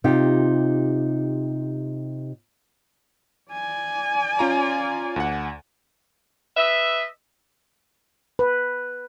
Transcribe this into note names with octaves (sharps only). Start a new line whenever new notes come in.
C3 D#4 F4 G4
D5 G#5
C#4 F4 A#5
D2 F#5
B4 D#5 E5
B4